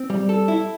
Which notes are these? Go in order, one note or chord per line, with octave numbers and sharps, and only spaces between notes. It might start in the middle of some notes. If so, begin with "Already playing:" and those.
Already playing: C4
G3
A4
E4